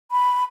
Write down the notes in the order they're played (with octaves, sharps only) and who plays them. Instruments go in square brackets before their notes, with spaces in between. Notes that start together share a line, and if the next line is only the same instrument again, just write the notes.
[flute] B5